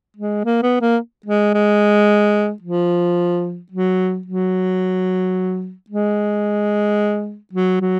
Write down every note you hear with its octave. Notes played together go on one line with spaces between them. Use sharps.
G#3
A#3
B3
A#3
G#3
G#3
F3
F#3
F#3
G#3
F#3
F#3